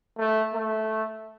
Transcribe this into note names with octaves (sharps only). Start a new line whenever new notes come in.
A3
A3